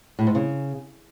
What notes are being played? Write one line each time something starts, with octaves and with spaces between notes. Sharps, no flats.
A2
G#2
C#3